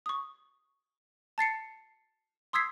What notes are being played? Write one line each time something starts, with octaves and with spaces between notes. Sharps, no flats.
C#6 D#6
A5 A6 C7 C#7
C6 D#6 E6 G#6 B6 C7